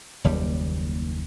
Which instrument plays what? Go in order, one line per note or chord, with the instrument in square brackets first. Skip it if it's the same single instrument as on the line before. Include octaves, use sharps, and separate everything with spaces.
[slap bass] F#1 D#2 G3